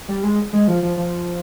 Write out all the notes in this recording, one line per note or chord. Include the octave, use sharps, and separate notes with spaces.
G3
G#3
G#3
F3
F3
F3